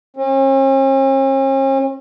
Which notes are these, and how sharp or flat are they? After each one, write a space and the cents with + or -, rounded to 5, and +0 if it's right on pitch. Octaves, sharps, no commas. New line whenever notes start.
C#4 -45